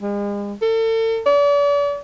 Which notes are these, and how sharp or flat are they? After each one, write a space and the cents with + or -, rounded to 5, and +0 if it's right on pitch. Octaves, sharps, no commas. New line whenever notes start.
G#3 -40
A4 +40
D5 -40